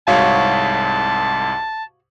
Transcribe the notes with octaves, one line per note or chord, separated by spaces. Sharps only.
C2 G#2 F#4 C#5 F5 A5